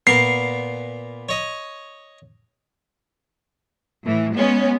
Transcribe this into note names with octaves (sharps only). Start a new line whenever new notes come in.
A#2 B3 A#4 C7
C#5 D#5
A2 E3
G#3 B3 C#4